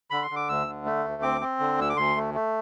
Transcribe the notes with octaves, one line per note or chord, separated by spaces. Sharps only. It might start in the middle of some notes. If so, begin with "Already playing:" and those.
D3 B5
C6
D3
D6
D2 E6
D3
A3
D2
C4 D6
C4
D3
D2 E6
D6
D2 C6
A3
A3